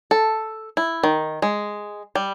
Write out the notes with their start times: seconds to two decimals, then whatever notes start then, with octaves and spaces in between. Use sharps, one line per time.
0.11 A4
0.77 E4
1.03 D#3
1.42 G#3
2.15 G3